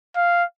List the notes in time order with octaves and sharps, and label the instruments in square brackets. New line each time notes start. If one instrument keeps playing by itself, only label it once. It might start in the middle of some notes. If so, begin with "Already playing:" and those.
[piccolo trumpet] F5